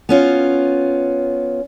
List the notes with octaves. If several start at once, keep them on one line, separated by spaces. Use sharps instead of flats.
B3 C#4 F4